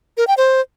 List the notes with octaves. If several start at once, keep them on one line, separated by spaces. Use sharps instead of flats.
A#4
G5
C5